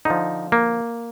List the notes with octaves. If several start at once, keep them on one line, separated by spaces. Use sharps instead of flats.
D3 F3 D#4
A#3